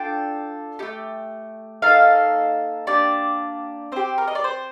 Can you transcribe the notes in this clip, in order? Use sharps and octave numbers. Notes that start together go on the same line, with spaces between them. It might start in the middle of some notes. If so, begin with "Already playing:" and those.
Already playing: D4 F4 A4 G5
A3 D#4 G4
A#3 D#4 A4 F5
A#3 D4 G4 D5
C4 G4 C5
A#4
D#5
D5
C5